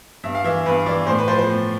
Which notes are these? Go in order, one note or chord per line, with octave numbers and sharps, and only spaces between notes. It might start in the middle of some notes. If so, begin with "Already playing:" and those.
G2 E5
F5
E3 E5
G2 B4
E3 D5
A2 C5
B4
F3 C5
C5
A2